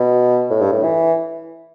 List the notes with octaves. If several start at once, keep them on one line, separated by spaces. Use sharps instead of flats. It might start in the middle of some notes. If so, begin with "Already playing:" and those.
Already playing: B2
A2
G2
A2
E3